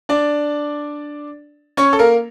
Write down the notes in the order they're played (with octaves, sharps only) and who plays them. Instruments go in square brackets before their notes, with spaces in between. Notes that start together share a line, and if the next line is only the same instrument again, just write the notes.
[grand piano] D4 D5
C#4 C#5
A4
A#3 A#4